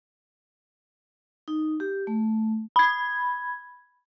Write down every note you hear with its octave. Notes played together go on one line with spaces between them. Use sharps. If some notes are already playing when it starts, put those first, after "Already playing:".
D#4
G4
A3
B5 G#6